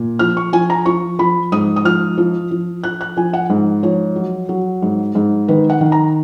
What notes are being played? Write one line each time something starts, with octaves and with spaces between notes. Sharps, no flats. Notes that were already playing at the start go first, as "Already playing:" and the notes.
Already playing: A#2
F3 F6
C#6
F3 G#5
A#5
F3 C#6
F3 B5
G#2 D#6
D#6
F3 F6
F3
F3
F3 F#6
F#6
F3 G#5
F#5
G#2
F3 C#5
F#3
F#3
G#2
G#2
D#3 B4
F#5
D#3
A#5